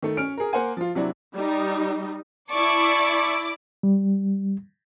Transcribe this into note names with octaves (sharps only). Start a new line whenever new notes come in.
D#3 A3
C#4 F6 D7
G#4 A#4
A#3 C5 F#5 G#5
F3 F4
C3 F#3 D4 E4
G3 D#4
E4 D5 A5 C#6 D6
G3